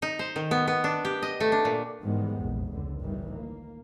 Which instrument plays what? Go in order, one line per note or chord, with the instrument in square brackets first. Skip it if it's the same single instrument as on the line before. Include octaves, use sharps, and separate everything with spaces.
[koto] D#4
C5
D#3
B3
B3
D4
G4
D#5
A3
D4
A#2
[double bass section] G#2 D#3 E3 G3 G#3 B3
F1 A#1 E2
C#2 D3
G1 A2 D#3 E3 G3
A#3